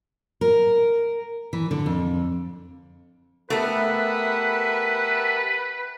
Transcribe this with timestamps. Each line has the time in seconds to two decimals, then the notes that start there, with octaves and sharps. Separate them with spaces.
0.41 A#4
1.53 E3
1.71 D3
1.86 F2
3.50 A3 B3 G4 A#4 B4 E5 F#5 A5